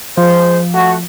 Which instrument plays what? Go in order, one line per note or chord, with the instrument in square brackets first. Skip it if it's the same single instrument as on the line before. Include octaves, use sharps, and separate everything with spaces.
[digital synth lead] F3 [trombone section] G#3 C5
[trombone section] A3 F#4